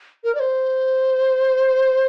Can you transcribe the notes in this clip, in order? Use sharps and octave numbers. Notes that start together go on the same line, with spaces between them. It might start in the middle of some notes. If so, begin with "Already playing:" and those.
A#4
D5
C5